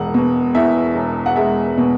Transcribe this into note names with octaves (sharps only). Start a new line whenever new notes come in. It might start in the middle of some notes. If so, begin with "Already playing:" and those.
Already playing: E1 G#3 F#5
B2
E2 E5
E1
F#5
G#3 E5
B2